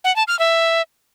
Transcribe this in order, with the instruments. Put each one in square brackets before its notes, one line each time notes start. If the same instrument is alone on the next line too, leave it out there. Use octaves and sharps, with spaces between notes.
[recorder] F#5
A5
F6
E5